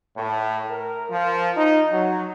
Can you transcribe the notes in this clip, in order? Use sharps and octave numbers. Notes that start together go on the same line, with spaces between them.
A2
A#4
F3
D#4
F#3